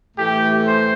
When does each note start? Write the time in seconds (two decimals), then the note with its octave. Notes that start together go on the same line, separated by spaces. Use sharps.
0.17 A2 E3 A3 G4
0.65 C5